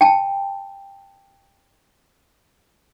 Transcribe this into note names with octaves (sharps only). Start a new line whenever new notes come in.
G5 A5